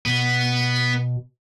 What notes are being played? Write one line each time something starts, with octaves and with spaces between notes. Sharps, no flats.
B2 B3